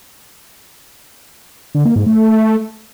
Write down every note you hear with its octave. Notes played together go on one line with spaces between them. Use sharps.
D3
A#3
G#2
A3